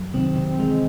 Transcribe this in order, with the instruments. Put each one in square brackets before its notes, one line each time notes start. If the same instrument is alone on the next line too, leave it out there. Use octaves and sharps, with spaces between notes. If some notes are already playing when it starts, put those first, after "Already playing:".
Already playing: [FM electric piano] F#2 F#3
[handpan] C3 C4 [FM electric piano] D#3
[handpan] C3 C4
[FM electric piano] E3 [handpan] G#3